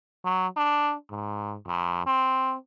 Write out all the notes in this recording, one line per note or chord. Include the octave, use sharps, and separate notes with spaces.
F#3
D4
G#2
F2
C4